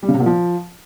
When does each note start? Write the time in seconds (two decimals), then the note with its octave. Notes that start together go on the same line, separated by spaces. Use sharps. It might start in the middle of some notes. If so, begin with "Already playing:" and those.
0.03 G3
0.09 C#3
0.14 C3
0.20 A#2
0.26 F3